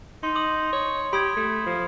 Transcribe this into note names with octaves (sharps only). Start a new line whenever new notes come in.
D#4 C6
D6 D#6 F#7
C#5
G4 B5 D#6 G#6
A3
F3